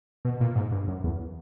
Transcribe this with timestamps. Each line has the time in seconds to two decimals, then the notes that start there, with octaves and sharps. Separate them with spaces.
0.25 B2
0.41 A#2
0.56 G#2
0.71 G2
0.88 F#2
1.04 E2